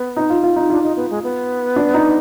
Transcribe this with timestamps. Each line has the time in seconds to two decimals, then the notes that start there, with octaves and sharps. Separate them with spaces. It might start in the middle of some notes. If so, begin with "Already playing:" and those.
Already playing: B3
0.17 D#4
0.30 F4
0.43 F4
0.56 D#4
0.70 D4 F4
0.83 D#4
0.97 B3
1.10 G#3
1.24 B3
1.76 D4
1.94 D#4